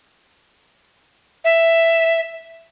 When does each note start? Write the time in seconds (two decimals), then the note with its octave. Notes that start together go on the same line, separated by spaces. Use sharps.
1.44 E5